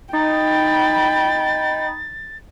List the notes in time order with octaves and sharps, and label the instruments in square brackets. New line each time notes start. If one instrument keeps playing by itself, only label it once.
[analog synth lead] D#4 [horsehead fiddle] G5 B5 [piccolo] A6